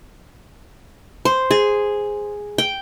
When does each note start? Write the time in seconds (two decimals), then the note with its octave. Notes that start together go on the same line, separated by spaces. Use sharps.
1.25 C5
1.51 G#4
2.58 G5